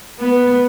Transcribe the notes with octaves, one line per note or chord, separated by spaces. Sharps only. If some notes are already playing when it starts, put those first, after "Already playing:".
B3